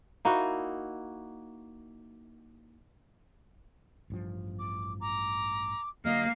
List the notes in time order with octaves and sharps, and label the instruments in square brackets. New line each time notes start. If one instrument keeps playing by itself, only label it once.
[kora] A#3 D#4 E4 F#4
[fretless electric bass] A1 G2 F3
[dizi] D6
[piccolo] A#5 [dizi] D6
[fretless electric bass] D3 F#3 G3 [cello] A#3 [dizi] D#5 [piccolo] F6